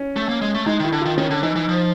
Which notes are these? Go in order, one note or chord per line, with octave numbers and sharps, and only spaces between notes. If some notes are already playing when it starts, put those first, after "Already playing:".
Already playing: C#4
A3
A#3
G#3
A3
G#3 D#4
D#3
E4
D3
D#3 F4
D#3 C#4
D3
E3 D#4
E3
F3